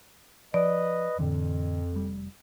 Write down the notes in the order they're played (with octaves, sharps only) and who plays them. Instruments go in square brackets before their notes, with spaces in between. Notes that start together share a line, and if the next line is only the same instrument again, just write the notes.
[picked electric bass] F3 [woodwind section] B4 D#5 [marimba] D5
[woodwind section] F2 [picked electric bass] A2 D3 E3
[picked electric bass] F1 G3